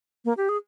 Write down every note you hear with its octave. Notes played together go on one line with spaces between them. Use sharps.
A#3
G4
G#4